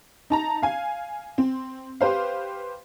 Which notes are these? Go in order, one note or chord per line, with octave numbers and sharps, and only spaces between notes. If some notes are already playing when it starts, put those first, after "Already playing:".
D#4 A5 A#5
F5 G#5
C4
G4 B4 C5 F5